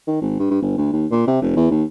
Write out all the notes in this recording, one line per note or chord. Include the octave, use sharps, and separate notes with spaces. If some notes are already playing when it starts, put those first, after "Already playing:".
D#3
G#1
G2
G2
G1
D2
D#2
A#2
C3
F1
E2
D#2